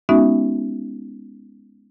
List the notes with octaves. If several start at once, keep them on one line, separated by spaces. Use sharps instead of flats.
G#3 B3 C#4 D#4 F#4 E5